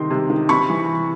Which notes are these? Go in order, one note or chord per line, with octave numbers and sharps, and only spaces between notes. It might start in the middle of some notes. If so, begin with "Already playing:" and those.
Already playing: C3 D#3 C6
C3
D#3
C3 B5 C#6
E3